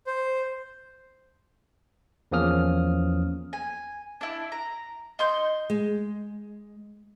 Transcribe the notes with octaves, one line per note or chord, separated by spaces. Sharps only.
C5
E2 F3 A#3 C#4 D#6 F6
G#5
D4 E4
A#5
D#4 C6 G6
G#3